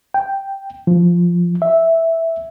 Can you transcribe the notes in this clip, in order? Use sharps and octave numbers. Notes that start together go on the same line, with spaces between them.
G5
F3
E5